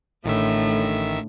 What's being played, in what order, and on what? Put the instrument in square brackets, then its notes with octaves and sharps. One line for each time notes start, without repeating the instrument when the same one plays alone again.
[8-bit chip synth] A1 D#3 E5 [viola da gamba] A2 D3